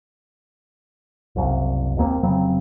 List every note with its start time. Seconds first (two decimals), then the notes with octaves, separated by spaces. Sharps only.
1.36 F#1 C2
1.96 G1 D#2 A#3 C4
2.23 F1 C#3 F#3 C4